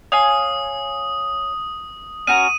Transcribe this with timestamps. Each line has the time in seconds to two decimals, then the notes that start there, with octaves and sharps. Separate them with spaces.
0.12 C#5 F5 G#5 D#6
2.27 C#4 F#4 A#4 D#7